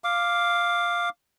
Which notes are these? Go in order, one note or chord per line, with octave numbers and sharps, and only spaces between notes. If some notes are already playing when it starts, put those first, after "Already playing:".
F5 D6